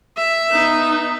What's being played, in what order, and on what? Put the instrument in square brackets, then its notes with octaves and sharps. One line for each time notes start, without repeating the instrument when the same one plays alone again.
[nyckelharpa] E5
[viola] B3 D#4